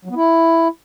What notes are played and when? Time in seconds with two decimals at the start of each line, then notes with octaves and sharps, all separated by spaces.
0.05 F#3
0.10 B3
0.16 E4